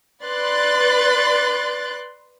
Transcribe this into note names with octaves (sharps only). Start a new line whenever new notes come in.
B4 D5 C6 F#6 A6